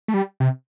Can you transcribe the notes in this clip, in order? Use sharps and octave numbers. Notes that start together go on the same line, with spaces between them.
A3
G3
C3